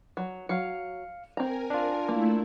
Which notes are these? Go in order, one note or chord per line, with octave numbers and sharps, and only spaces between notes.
F#3
F#3 F5 C#7
C4 A#4 G#5 A#5
D4 F4
A3 A#3 E4